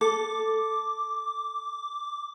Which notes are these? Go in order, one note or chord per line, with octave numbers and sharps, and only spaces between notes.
A4 D6